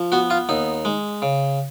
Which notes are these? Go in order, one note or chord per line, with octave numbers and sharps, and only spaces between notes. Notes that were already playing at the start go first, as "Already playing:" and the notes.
Already playing: F3
B3 F#4
F4
D#2 D#4
G#3
C#3